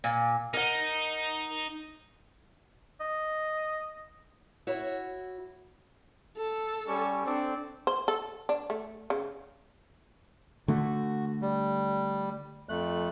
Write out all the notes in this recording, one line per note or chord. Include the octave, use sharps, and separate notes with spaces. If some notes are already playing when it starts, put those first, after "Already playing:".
A#2
D#4 A#4 F#5
D#5
E4 F#4 C#5
A4
G3 C#4 C#6
C4 D4 A4 D5
C5
A4
D4
A3
C#3
D3 A3 F#4
G3
F2 A3 F#6